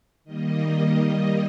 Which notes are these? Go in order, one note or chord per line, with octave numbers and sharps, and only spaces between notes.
D#3 G3 A#3 D#5